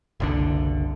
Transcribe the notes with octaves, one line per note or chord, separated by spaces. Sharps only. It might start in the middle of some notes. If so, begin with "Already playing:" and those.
F#1 C2 D3